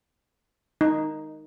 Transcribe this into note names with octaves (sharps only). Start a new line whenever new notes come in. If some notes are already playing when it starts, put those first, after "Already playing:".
D#4